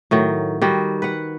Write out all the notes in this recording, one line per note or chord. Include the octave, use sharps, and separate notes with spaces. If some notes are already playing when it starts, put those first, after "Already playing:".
A2 D#3 F#3
D#3 G3 F#4
B4 F#5